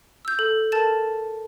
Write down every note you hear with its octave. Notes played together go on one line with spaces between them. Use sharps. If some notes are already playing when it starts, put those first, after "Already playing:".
E6 G6
A4
A4 A#4 A5 A6 E7